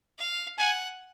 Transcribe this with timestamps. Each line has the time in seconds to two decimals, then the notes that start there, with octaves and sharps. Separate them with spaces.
0.19 F5
0.58 F#5 G#5